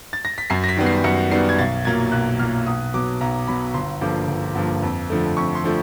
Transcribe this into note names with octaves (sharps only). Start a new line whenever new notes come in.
A6
A#6
B6
F#2 C7
A#6
B6
D#3 G3 B3
C7
F#2 C#7
D#3 G3 B3 C7
G#6
B1 A6
A#2 F#3 A#3 G#6
B1 F#6
A#2 F#3 A#3 F6
B1 D#6
B2 F#3 D6
B1 A#5
B2 F#3 B5
G1 C6
G2 D3 F3 A#3 D6
G1
G2 D3 F3 A#3
F2
D3 F3 A3
F2 C#6
C6
D3 F3 A3